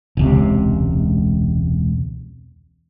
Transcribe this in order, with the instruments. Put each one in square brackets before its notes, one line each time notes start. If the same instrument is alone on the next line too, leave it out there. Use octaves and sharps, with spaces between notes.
[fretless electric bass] E1 C#2 C3